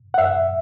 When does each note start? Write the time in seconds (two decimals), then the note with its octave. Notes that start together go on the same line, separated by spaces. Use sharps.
0.14 F#5
0.18 F#2 E5